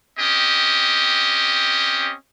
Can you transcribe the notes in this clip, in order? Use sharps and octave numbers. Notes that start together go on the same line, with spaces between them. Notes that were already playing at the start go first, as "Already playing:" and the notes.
C4 C#4 G4 D#5